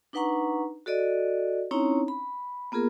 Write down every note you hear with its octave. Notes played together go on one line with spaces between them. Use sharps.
D4 D#4 B4 F#5 A#5 C#6
F#4 A4 D5 D#5
C4 C#4 D#4 E4 C#5 A#5
B5
A#3 B3 F4 G#4 A#4